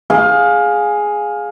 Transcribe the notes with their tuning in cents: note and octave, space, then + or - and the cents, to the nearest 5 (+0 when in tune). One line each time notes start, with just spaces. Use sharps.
G#4 +0 F5 +20